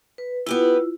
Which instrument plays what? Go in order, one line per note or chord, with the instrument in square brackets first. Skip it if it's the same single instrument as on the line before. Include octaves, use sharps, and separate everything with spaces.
[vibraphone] B4
[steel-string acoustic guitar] B3 G4 B4 [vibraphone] E4 F4